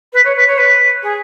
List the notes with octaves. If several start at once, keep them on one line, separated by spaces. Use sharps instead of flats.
B4
C#5
B4
C#5
B4
G#4